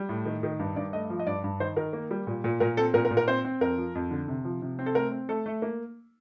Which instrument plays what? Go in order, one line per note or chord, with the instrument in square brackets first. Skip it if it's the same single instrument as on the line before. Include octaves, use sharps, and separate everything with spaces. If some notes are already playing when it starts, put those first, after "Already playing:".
Already playing: [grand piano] G3
A2
D#3
D#3
G2
G2 D5
A3 D#5
F3
D#5
G2 D5
G2
D#3 C5
D#3 A#4
A#3
G3
A#2
A#2
A#2 A#4
C4 A4
A#2 A#4
A#4
A#2
A#4
C4 C5
C4
F2 A#4
F3
F2
D3
C3
F3
C3
C4
A4
A3 A#4
C4
A3 A4
A3
A#3